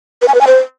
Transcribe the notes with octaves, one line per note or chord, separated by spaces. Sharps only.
B4
G#5
B4
G#5
C5